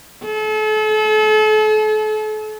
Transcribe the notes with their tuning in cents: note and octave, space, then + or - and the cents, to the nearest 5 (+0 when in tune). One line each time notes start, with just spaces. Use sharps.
A4 -40